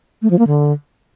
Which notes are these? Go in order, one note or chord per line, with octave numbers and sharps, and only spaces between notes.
A3
F3
A#3
D3